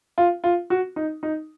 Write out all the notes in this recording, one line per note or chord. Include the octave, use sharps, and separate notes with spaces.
F4
F4
F#4
D#4
D#4